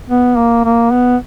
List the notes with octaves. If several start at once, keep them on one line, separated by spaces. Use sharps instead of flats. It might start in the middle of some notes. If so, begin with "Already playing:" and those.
B3
A#3
A#3
B3